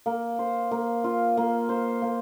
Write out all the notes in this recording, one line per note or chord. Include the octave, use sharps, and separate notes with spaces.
A#3
C5
A#3
F4
A#3
C5
A#3